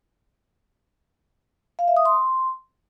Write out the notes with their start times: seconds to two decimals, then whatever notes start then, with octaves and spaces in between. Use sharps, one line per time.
1.79 F5
1.88 E5
1.97 D#6
2.05 C6